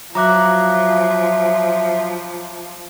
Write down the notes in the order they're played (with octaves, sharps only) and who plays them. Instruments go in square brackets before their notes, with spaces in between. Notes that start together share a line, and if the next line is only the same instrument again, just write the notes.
[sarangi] F3 [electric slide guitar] F#3 [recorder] E5 [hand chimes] A#5 D6 F#6